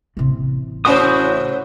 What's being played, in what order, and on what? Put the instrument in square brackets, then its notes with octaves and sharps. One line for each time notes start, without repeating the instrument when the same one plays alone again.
[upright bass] A1 C3
[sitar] A3 C#4 C5 [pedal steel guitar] E4 F#4 D#6